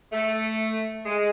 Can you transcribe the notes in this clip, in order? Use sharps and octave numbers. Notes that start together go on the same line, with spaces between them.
A3
G#3